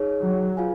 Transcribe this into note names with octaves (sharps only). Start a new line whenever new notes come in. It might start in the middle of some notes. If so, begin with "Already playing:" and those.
Already playing: D#4 G#4 C#5
F#3
F4 G#4 B4 F5 G#5